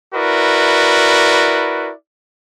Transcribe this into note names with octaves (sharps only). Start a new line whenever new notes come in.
E4 F#4 A#4 B4 D5